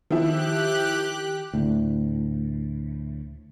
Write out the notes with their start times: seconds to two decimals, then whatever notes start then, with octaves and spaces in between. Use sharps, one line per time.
0.11 D#3 F3 E4 G4 F#6
1.53 D2 A2